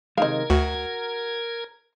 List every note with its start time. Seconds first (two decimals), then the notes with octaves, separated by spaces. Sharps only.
0.18 C3 D#3 G#3 A#4 D#5 F5 G#6
0.50 D2 F#4